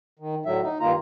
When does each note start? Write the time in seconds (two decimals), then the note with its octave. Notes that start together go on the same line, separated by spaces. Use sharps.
0.19 D#3
0.45 A2 D3 F#3 E5
0.62 D#4
0.80 G2 D#3 A#3 F4 A#5